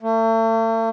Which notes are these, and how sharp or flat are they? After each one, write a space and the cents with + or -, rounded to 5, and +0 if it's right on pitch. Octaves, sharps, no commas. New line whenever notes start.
A3 +40